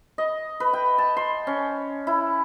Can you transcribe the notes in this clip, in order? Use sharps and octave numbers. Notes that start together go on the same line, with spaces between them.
D#5
B4
G5
A5
C6
C#4
E4